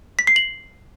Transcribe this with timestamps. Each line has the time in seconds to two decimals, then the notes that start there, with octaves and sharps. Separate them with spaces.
0.19 B6
0.27 C7
0.36 F#7